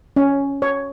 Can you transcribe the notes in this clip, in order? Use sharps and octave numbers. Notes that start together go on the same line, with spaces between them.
C#4
C#5